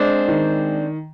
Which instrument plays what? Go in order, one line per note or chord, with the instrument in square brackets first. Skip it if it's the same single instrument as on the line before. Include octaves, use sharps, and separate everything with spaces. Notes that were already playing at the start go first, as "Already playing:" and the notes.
Already playing: [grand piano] G#3 [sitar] C4 D4
[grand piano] D#3